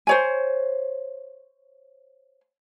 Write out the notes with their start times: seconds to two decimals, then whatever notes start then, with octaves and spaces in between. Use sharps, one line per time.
0.07 C5 C#5 G#5